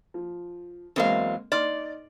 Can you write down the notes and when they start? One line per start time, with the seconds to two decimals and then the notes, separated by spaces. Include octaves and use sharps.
0.14 F3
0.96 E2 F#3 G#3 A#3 C4 F5
1.52 D#4 D5 C6 F6